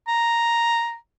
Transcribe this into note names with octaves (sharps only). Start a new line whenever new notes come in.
A#5